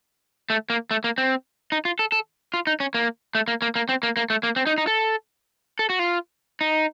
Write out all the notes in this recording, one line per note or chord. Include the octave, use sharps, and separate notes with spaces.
A3
A#3
A3
A#3
C4
D#4
F4
A4
A4
F4
D#4
C#4
A#3
A3
A#3
A#3
A#3
C4
A#3
A#3
A3
A#3
C4
D#4
D#4
A4
A4
F#4
F4
D#4